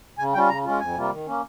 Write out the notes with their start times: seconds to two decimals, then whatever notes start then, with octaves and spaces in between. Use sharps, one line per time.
0.18 C#3 G#5
0.34 G3 C#4 F4 G5
0.49 C#3 A#5
0.64 G#3 C#4 F4
0.80 F2 G#5
0.95 C3 G3 A#3 F4
1.11 D#3
1.26 A#3 C#4